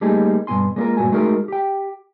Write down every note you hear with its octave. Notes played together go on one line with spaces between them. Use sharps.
G3 A3 A#3 D#4 G4 G#4
G2 B2 C4 D4 G#5 C6
G#3 A#3 D4 E4 F4 A#4
G2 A#2 F#4 G#5
G#3 A3 D#4 F#4 G#4 A#4
G4 G5